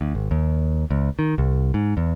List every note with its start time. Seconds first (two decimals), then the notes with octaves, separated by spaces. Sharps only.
0.01 D2
0.15 G#1
0.31 D#2
0.91 C#2
1.19 D#3
1.38 C2
1.74 G#2
1.97 E2